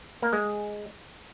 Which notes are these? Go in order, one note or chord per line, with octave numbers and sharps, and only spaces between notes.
A#3
G#3